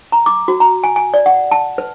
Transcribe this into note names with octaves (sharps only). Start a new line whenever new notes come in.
A#5
D6
F#4
A#5
G#5
G#5
D5
F#5
A5
B4